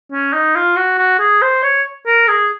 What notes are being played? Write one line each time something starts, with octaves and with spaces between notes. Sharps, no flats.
C#4
D#4
F4
F#4
F#4
G#4
C5
C#5
A#4
G#4